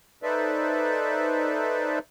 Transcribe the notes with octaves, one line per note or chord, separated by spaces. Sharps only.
D#4 A4 B4 C5 D5 E5